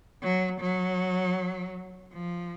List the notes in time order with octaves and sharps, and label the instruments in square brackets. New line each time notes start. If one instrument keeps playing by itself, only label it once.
[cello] F#3
F#3
F3